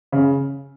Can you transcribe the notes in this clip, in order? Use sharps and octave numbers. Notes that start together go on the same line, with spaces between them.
C#3